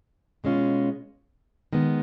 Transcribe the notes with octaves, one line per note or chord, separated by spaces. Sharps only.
B2 G#3 C#4 F4
D#3 G#3 B3